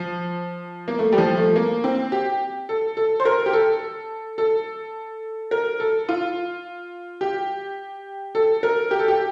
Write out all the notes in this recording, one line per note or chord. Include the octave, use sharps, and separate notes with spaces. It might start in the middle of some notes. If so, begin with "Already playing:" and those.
Already playing: F3
A#3
A3
G3
F3
A3
A#3
C4
G4
A4
A4
C5
A#4
G4
A4
A4
A#4
A4
F4
G4
A4
A#4
G4
A4
G4